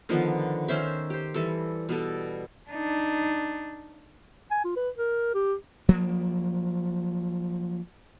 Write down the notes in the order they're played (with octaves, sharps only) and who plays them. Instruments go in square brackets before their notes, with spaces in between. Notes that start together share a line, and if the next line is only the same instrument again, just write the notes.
[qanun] D3 D#3 F3 B3
D#3 C#4 C5 E5
G4 C5
E3 G3 A4
B2 G3 A4
[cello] D4 D#4
[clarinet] G#5
F4
B4
A#4
G4
[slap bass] F3 F#3 A#3